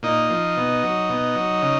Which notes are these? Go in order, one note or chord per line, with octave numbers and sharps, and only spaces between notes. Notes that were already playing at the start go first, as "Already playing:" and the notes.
A#2 D#4
F3
B2
F#3
B2
F#3
C#3